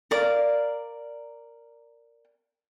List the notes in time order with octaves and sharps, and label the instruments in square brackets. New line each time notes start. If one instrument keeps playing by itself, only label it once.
[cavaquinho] A#4 D5 F5